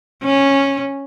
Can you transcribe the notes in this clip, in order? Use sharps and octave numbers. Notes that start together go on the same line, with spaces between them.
C#4